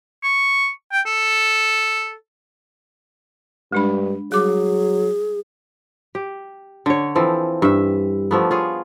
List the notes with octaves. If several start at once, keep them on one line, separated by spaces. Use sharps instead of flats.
C#6
G5
A4
G2 G#3 D4 B5
F#3 G3 G#4 D6
G4
D3 C#5
E3 F3 C4 A4
G2 E5
F3 A3 B3
F4 G#4 C#5